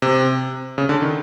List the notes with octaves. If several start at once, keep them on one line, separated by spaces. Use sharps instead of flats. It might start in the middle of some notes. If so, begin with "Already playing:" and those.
C3
C#3
D3
D#3